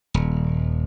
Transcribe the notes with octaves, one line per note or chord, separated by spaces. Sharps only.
D#1